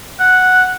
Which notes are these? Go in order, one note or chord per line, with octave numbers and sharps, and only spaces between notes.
F#5